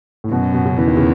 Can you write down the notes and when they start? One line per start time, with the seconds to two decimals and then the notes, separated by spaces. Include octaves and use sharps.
0.24 A2
0.31 F#2 B2
0.54 B2
0.65 C#3
0.77 E2 E3
0.87 D#3
0.97 C#3